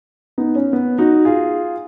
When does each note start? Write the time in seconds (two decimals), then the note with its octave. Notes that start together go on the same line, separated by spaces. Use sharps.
0.38 B3 D#4
0.55 C#4
0.73 B3
0.98 D#4 F#4
1.25 F4 G#4